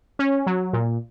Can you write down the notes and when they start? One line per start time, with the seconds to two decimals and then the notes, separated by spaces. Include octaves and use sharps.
0.19 C#4
0.46 F#3
0.73 A#2